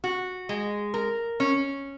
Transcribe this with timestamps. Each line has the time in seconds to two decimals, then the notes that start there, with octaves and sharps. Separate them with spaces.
0.04 F#4
0.49 G#3
0.94 A#4
1.40 C#4